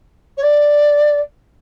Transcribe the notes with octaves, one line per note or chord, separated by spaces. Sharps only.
C#5
D5